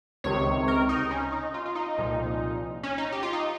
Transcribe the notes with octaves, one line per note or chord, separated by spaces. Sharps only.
C#2 C3 D#3 C#5
A#4
D#4
C#4
D#4
F4
F4
D#4
C2 A#2 F3
C#4
D#4
G4
F4
D#4